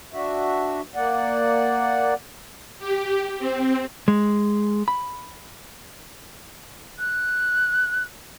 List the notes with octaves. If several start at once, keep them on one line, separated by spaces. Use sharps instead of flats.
D4 F#4 E5
A#3 D5 F#5
G4
C4
G#3
B5
F#6